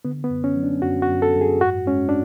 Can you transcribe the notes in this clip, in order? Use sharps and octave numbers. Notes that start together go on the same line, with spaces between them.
D3 B3
B3
F#2
C#4
F#3
D4
F#2 F#4
F#4
F#2
A4
F#2
G#4
G#2 F#4
G#3 C#4
D4